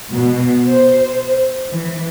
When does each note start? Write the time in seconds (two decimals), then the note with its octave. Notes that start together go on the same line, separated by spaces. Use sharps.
0.13 B2
0.66 C5
1.70 E3